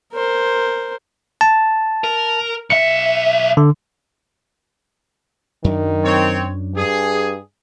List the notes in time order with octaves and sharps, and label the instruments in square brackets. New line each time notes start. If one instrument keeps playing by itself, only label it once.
[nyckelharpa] A#4 C5
[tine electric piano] A5
[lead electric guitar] A#4
[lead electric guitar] B1 E5 [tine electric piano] C#7
[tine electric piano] D3
[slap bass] F#2 F#3 D4 [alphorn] D#3
[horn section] C4 C#5
[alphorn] G2 [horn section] G#4